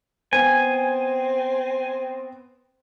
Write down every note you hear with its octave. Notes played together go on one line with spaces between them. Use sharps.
B3 C4 G#5